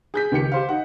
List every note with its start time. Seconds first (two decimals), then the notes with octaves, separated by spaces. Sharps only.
0.14 G#4 G6 B6
0.32 C#2 D#3 G4 C#7
0.52 G4 C5 F5
0.69 D#4 F#5